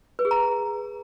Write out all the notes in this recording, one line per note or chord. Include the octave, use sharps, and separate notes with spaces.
B4
G#4
A#5